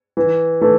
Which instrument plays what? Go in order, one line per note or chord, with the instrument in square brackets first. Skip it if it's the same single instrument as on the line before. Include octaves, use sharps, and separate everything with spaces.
[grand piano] E3
E3 A3